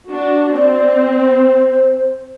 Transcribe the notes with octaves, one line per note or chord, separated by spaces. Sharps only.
D4 F#4
C4 D5
C5